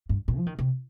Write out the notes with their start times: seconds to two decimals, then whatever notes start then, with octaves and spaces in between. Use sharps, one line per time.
0.09 G2
0.28 A#2
0.38 F3
0.46 D#3
0.59 C3